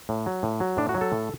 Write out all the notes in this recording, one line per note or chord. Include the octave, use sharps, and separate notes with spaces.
A2
F#3
A2
F#3
A2 D4
F#4
F#3
A4
A2